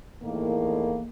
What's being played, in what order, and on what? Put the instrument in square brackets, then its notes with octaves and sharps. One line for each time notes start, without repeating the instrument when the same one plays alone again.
[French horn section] E2 A2 D#3 A#3